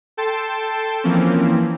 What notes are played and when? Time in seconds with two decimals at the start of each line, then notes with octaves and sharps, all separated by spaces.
0.17 A4 G5 A5 C6
1.03 E3 F3 A#3 C4 C#4